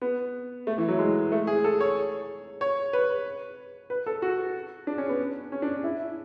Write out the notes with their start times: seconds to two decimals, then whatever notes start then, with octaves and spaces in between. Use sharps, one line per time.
0.01 B3
0.67 A3
0.78 E3
0.88 F#3
0.99 G#3
1.32 A3
1.47 G#4
1.64 A4
1.80 C#5
2.61 C#5
2.93 B4
3.90 B4
4.06 A4
4.22 F#4
4.87 D4
4.98 C#4
5.09 B3
5.52 C#4
5.62 D4
5.84 E4